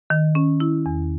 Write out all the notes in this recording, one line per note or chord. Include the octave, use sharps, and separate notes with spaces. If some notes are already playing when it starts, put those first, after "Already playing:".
D#3
C#4
E4
E2